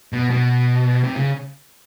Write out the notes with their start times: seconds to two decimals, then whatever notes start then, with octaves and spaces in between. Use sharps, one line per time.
0.13 B2
0.30 B2
1.04 C3
1.16 C#3